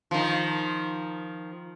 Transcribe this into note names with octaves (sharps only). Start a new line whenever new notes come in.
D#3 F3